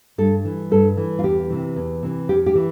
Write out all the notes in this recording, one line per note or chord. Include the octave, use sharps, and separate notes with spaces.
G2 A4
E3
G2 A4
E3
F4
E2 G4
C3 E3
E2
C3 E3
F2 G4
G4
E3